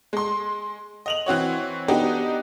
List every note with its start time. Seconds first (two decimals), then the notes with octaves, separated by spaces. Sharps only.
0.13 G#3 C6
1.06 D#5 F7 F#7
1.26 E3 C4 F#4 C#5
1.88 B3 D4 D#4 F#4 G4